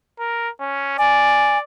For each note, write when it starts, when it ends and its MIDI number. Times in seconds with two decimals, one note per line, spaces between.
0.19 0.49 70
0.60 0.96 61
0.98 1.63 74
0.98 1.58 80